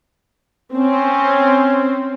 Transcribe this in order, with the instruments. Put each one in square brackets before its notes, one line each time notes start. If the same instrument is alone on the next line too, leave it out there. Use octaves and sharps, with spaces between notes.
[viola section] C4 [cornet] C#4